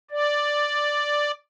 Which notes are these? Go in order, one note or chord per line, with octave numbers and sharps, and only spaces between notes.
D5